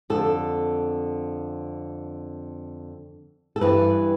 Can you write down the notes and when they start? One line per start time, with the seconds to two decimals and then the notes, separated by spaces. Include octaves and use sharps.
0.10 F2 D3 A4
3.56 A4
3.61 G2 E3 B4